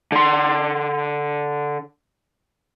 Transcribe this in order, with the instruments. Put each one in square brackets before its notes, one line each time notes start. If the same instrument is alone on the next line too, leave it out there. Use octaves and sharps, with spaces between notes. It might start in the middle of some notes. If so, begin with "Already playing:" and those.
[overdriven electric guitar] D3 C6